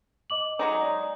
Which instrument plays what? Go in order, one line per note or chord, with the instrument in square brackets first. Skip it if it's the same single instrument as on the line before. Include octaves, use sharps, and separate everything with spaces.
[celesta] D#5 D6 F#7
[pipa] F#3 G#3 D#4
[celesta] D5